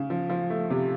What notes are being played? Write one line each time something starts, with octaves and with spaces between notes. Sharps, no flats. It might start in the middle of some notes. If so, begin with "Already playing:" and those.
Already playing: C#3
F3
F3
A3
C3